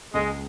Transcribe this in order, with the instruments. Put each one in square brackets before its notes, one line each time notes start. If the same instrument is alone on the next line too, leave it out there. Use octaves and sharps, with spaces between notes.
[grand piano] C#2 [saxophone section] G#3